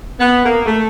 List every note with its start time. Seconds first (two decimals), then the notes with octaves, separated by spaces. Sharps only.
0.19 B3
0.43 A#3
0.66 A3